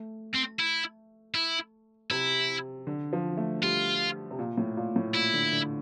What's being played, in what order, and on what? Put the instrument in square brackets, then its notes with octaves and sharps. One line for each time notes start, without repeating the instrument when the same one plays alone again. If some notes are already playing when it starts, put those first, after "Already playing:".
Already playing: [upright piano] A3
[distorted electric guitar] C4
E4
E4
[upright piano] C3 [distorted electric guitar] E4
[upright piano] D3
F3
A3
[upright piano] G3 [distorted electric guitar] F4
[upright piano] C3
A#2
A2
A#2
A2
[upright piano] A#2 [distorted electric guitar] E4
[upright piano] D3
D3